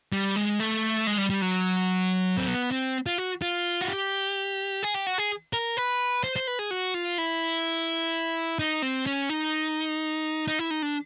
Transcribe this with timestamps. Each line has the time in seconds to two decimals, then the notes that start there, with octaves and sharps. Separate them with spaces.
0.13 G3
0.36 G#3
0.60 A3
1.07 G#3
1.18 G3
1.30 G3
1.42 F#3
2.37 C4
2.48 B3
2.71 C4
3.06 F4
3.18 F#4
3.42 F4
3.81 F#4
3.88 G4
4.83 G#4
4.94 G4
5.07 F#4
5.18 G#4
5.53 A#4
5.77 B4
6.24 C5
6.36 C5
6.47 B4
6.59 G#4
6.71 F#4
6.94 F4
7.18 E4
8.59 D#4
8.82 C4
9.06 C#4
9.29 D#4
10.48 D#4
10.59 E4
10.70 D#4
10.82 D4